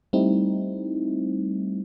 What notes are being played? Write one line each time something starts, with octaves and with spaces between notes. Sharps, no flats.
G3 A3 C4 D#4 E4